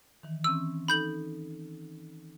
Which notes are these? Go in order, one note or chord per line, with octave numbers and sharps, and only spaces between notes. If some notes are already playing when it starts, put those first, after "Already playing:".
D#3 E3
E3 C4 C#4 E6
D#4 A4 B5 G6 F#7